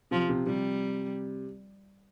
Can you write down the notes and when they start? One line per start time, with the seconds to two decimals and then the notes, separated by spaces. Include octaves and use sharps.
0.11 C3 F3
0.29 C3
0.46 C3 G3